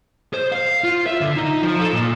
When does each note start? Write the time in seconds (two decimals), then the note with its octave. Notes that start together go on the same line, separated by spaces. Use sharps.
0.34 C5
0.52 F5
0.84 F4
1.06 E5
1.21 D3
1.37 D#4
1.62 F3
1.80 A4
1.93 A#2